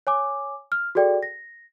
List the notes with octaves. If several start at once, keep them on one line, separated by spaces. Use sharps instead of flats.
C#5 G#5 D6
F6
F#4 G#4 A4 D5 G5
A#6